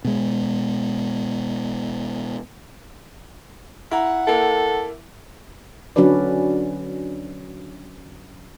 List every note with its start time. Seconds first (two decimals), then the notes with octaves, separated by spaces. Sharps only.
0.05 B2 G#3
3.91 E4 F#5 A#5
4.27 A#3 E4 A4
5.96 D3 F#3 C#4 D4 B4 D5